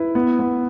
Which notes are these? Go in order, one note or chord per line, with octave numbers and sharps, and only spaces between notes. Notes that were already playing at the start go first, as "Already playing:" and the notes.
Already playing: E4 B4
B3
B3